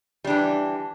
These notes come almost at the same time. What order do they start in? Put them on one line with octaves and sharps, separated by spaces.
G3 D4 E3